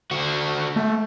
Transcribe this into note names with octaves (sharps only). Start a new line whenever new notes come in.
D3 F#4
A3